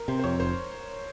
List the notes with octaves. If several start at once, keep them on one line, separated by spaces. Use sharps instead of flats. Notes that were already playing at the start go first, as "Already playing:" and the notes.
Already playing: A#4
C3 C5
C5
F2 C#5
F1 C5